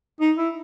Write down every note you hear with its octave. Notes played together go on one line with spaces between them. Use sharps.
D#4
E4